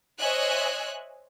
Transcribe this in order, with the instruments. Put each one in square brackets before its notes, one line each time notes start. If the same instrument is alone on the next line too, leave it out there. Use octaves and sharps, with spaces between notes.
[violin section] C5 C#5 D#5 E5 G#5 F#6